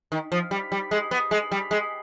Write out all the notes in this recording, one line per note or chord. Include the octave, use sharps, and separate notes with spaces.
D#3
F3
G3
G3
G#3
B3
G#3
G3
G#3